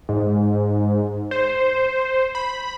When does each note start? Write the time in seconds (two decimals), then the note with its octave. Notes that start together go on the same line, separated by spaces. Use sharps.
0.09 G#2
1.31 C5
2.35 B5